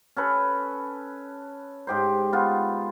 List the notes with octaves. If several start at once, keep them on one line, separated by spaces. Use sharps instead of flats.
C#4 A4 B4
G#2 G4 C5
B3 F4